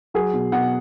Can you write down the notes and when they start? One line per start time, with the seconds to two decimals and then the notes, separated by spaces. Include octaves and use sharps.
0.14 F#3 G#4
0.33 B2
0.52 B2 F#5